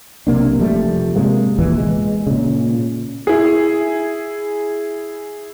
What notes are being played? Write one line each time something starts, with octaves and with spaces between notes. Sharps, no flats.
B1 C3 A#3 D4
F1 F3 G3 A3
C3 G3 G#3 A#3
E2 A#2 E3
G#3
A#2 C#3
E4 G#4